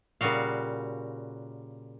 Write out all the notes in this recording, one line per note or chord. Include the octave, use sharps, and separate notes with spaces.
A#2 C#3 G3 F#4 F5